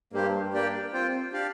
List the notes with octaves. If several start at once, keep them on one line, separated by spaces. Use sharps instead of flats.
G2 A#3 G4 C5
A#3 D4 G4 D5 G5
C4 F4 C5 G5
D4 G4 D5 F5